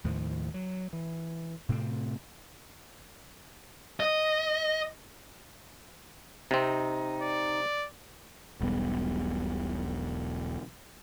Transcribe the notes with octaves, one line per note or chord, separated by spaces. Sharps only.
D#2 A2 D#3 F3
F#3
E3
A2 C3 A3 C4
D#5
C3 C4 D#4
D5
E1 B1 G3 B3